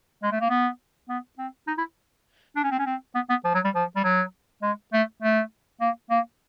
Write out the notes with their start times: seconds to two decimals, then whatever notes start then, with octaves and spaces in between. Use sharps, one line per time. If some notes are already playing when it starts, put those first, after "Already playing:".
0.23 G#3
0.32 A3
0.41 A#3
0.50 B3
1.09 B3
1.38 C4
1.67 D#4
1.78 E4
2.56 D4
2.64 C#4
2.71 C4
2.78 C#4
2.86 C4
3.15 B3
3.30 B3
3.45 F3
3.55 F#3
3.64 G3
3.75 F3
3.96 G3
4.04 F#3
4.62 G#3
4.93 A3
5.22 A3
5.81 A#3
6.10 A#3